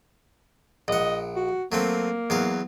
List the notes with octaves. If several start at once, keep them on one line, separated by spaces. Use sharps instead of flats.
A#1 D#5 F#5
F#4
F#3 A3 A#3 C4
E2 F#3 F5